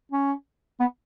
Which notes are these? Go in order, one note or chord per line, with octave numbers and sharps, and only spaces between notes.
C#4
B3